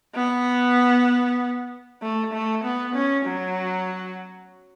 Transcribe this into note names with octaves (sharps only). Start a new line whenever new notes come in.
B3
A3
A3
B3
C#4
F#3